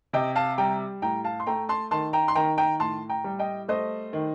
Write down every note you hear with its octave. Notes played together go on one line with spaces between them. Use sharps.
C3 D#5 G5
F5 A5
G3 G5 A#5
A2 G5 A#5
F5 A5
C6
A3 G5 A#5
A5 C6
D#3 A5 C6
G5 A#5
C6
D#3 G5 A#5
G5 A#5
A2 A5 C6
G5 A#5
G3
D#5 G5
A3 C5 D#5
D#3